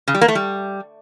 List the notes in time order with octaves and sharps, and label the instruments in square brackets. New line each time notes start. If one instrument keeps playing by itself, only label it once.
[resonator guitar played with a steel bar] C#3
G3
A#3
A3
G3